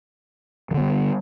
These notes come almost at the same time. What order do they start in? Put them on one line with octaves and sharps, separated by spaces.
E3 D3 B3 G3